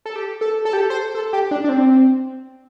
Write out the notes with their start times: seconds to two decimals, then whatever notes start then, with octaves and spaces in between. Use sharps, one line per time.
0.06 A4
0.16 G4
0.41 A4
0.65 A4
0.73 G4
0.81 A4
0.90 C5
1.15 A4
1.33 G4
1.51 D4
1.64 D4
1.69 C4